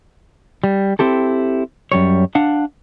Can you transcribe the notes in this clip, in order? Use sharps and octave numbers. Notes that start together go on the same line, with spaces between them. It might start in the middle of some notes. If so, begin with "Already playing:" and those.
G3
C4 E4 G4 A4
F#2 G3 C#5
D4 F5 F#5